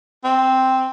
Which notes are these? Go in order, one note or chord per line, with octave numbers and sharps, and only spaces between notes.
C4